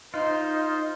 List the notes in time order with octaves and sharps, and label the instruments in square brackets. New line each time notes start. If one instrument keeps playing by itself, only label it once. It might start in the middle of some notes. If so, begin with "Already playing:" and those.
[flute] D#4 [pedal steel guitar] F4 [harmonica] C5 [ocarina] D#5